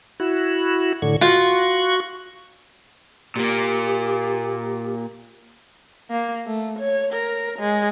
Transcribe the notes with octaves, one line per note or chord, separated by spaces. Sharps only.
E4 F#4
A2 D3 C#6
F4 F#4 C#6
A#2 A#3 G4
A#3
A3
C#5
A#4
G#3